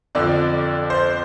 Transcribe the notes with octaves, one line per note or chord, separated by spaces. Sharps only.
F2 D3 F3 D5
C5